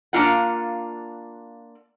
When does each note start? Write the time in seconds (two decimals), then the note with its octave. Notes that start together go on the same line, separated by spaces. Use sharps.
0.13 A#3 D4 F4 F#5